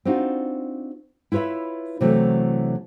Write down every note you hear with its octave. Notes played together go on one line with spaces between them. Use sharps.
C4 D4 D#4 F4 F#4
E4 F4 B4 C#5 E5
C3 E3 F#3 A3